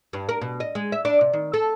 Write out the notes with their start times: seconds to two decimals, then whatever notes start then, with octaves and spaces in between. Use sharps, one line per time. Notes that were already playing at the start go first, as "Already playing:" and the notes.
0.13 G2
0.29 A#4
0.41 B2
0.60 D#5
0.75 G#3
0.92 E5
1.05 D4
1.21 C3
1.33 D#3
1.54 A4